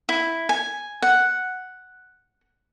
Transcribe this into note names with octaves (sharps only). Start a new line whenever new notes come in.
E4
G#5
F#5